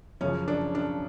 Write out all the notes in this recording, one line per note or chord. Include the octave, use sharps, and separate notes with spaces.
F#2 C#3 F3 C#4
D4
D4